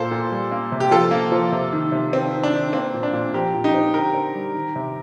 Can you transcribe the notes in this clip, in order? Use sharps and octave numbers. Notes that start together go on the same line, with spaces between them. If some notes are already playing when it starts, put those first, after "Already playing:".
Already playing: A#2 A#3 A4 C5
A#2
G3
A#3
C3
G4
F3 F4 A4
A#3
F3
C3
D#3
C3
D#3 C4
D#3
D4
D#3
A#3 C4
A#2
D4
A#2
F3 G4 A#4
A#2
D#4 G4
C4
D3 G4 A#4
C4
G3
D#3
C3